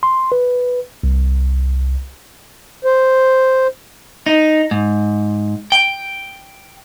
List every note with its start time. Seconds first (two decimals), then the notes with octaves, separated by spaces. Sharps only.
0.03 C6
0.32 B4
1.03 C2
2.85 C5
4.26 D#4
4.71 G#2
5.72 G5